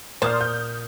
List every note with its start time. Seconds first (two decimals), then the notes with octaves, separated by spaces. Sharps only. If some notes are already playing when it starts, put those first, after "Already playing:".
0.22 A#2 C5 A5 D#6 F6
0.41 G6